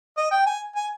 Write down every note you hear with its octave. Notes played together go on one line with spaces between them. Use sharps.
D#5
G5
G#5
G#5